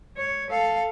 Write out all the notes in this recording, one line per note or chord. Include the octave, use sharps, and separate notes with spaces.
C#5
A4 F5